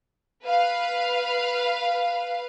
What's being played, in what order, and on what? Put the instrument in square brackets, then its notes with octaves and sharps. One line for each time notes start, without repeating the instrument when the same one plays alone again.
[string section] B4 F5